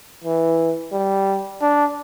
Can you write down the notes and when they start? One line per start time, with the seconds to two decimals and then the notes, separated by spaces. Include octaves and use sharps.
0.24 E3
0.92 G3
1.61 D4